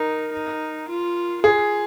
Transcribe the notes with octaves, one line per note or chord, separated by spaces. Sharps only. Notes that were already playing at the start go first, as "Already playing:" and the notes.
Already playing: D#4 A#4
D#4
F4
F4 G#4